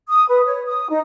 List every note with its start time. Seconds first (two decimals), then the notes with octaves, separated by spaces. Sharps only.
0.08 D#6
0.29 B4
0.46 C#5
0.67 D#6
0.90 D#4